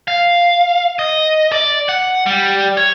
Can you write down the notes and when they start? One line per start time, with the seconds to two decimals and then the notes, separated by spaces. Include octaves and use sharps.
0.08 F5
0.99 D#5
1.52 D5
1.89 F#5
2.26 G3
2.77 C#5